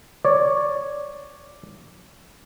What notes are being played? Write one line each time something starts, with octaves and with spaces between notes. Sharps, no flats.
C#5 D5